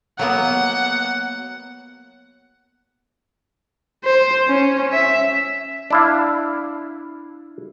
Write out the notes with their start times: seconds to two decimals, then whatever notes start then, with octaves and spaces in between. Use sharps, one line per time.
0.19 F#3 A#3 B3 F#5
4.05 C5
4.48 C#4
4.93 E5
5.90 D4 E4 F5